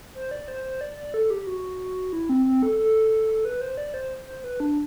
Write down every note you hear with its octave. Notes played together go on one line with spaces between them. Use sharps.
C5
D5
C5
C5
D5
D5
A4
G4
F#4
E4
C4
C4
A4
A4
B4
C5
D5
C5
C5
C5
B4
D4